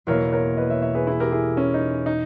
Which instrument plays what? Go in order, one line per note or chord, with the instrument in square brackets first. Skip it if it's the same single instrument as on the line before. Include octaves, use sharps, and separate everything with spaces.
[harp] E2 B2 A#3 [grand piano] A#4 C#5
[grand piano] A#4 C#5
B4 D#5
C#5 E5
C#5 E5
G#4 B4
E4 G#4
G4 A#4
E4 G#4
C#4
D#4
D#4